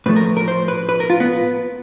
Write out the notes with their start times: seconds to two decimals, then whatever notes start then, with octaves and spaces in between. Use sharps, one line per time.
0.06 A2 F3 A3 B4
0.16 A#4
0.37 A#4
0.48 C5
0.68 B4
0.89 B4
1.00 A#4
1.10 F4
1.20 B3